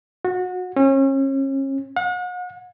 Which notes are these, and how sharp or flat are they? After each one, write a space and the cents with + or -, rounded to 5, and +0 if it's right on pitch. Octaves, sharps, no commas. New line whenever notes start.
F#4 -25
C#4 -35
F#5 -40